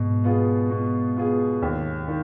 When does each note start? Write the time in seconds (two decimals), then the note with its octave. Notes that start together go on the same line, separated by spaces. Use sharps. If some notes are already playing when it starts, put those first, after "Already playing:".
Already playing: G#2 B2
0.24 B3 F4 G#4
0.70 B2
1.16 B3 F4 G#4
1.62 D#2
2.08 D#3